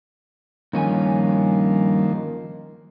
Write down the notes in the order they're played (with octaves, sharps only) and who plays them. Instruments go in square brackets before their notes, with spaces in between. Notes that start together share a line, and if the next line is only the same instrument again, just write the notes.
[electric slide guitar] G2 C#4 G#5 [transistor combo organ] D#3 F3 A#3